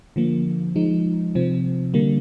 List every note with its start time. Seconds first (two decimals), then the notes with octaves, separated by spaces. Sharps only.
0.16 D3 F3 A#3
0.76 F3 G#3 D#4
1.35 C3 F3 C4
1.94 D3 G3 A#3